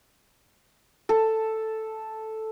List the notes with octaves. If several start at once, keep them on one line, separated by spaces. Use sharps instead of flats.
A4